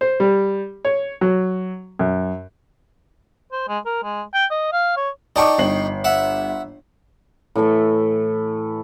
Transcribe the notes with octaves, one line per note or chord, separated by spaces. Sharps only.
C5
G3
C#5
F#3
F#2
C5
G#3
A#4
G#3
G5
D#5
F5
C#5
D#4 D5 G5 A5 C#6 D6
G1 C7 F#7
E5 F#5
A2 E3 A3 E5